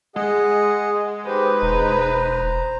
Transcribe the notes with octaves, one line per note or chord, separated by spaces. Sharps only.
G#3 G#4 D#5 F#5
D#4 G4 B4 C5
E1 C5 A#5